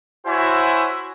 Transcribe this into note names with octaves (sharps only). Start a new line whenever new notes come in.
E4 F#4 C5 C#5 E5 G#5